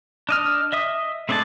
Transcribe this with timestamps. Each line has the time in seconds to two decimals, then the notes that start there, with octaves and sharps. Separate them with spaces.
0.29 D4 D#5 F6
0.72 D#5 E5 D#6
1.29 A3 C4 D4 G#4 A5